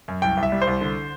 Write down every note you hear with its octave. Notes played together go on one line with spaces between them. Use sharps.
F#2
C2 G5
C2
E5
G3
C5
C2
D3